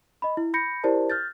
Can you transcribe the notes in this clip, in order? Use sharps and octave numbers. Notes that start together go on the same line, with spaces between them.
D#5 B5
E4
B5 G6 A#6 C#7
E4 G4 A#4 C5 D5 A5
F6 G6 A6